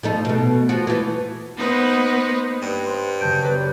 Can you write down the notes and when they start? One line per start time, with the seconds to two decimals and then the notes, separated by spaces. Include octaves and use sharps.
0.03 F3 A3 D#4
0.25 B2 A3
0.69 F3 F#4
0.87 E3 A3
1.57 A#3 B3 D#4 B4 C5
2.62 G2 B5 F#6 G6
2.83 C5 C6 F#6
3.20 F#2 C#3 A5 G6 D7
3.42 G4 B4 D5 A#5